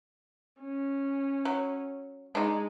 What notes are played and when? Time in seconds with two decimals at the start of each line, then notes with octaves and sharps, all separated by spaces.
0.62 C#4
1.45 F#3
2.35 G#3 D4 D#4